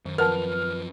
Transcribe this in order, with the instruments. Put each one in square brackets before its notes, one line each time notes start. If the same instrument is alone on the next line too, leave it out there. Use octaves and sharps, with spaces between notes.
[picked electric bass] F#2 [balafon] D#3
[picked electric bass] F#2 F3 [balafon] A#4 F#5 A5 [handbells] B4 [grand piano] F6